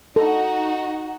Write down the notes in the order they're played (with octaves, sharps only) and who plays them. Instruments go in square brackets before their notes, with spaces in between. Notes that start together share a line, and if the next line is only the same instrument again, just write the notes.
[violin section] D#4 F#4 [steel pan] A4